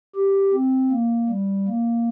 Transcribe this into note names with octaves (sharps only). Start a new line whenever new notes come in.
G4
C4
A#3
G3
A#3